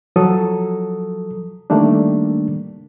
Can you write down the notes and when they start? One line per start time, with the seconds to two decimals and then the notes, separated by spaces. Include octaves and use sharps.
0.16 F3 F#3 A4 D#6
1.70 D#3 G3 A3 A#3 D4